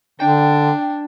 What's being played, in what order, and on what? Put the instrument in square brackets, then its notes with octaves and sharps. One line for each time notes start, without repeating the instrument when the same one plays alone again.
[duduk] D3 [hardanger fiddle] D4 [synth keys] G5